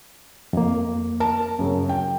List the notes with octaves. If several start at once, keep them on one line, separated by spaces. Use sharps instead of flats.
F2 A#3
A#4 A5
F#2 C#3
G5